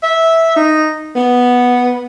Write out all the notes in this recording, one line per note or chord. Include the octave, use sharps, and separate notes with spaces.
E5
D#4
B3